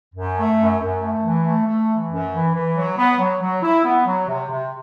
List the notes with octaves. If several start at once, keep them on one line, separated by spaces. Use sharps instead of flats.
F#2
A3
F#2
F#2
A3
E3
A3
A3
E3
F#2
E3
E3
F#3
B3
F#3
F#3
E4
B3
F#3
C3
C3